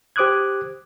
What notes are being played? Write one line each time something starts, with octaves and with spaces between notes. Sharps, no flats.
G4 C5 D6 D#6 F#6 G#6